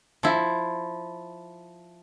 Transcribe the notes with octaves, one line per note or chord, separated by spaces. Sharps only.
F3 E4